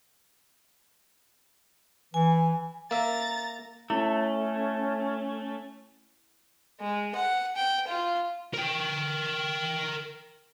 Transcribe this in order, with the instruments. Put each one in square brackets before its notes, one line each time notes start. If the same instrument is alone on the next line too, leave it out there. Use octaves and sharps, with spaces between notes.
[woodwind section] E3 [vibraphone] G#5
[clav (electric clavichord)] A#3 E5 [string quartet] A#5 A6
[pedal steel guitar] A3 [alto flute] C#4 [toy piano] E4
[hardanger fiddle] G#3
F#5
G5
F4
[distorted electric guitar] A#4 G5